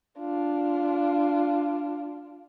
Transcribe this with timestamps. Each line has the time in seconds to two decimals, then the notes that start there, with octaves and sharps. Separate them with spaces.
0.19 D4 F4